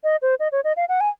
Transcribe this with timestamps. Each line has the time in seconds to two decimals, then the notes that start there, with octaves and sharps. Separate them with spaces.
0.04 D#5
0.22 C5
0.40 D#5
0.52 C#5
0.64 D#5
0.77 F5
0.89 F#5
1.01 G#5